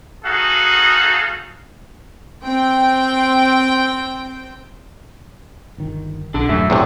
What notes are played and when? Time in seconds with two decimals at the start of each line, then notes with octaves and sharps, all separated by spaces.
0.25 D#4 F#4 G#4 A4 F5 F#5
2.45 C4 G5
5.78 G1 D#3
6.34 B1 D4 A4
6.49 E1 G2 F#3 A3 E5
6.70 E2 A2 C3